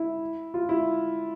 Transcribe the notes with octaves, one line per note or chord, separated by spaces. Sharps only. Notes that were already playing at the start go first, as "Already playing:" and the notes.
Already playing: E4
F4
E4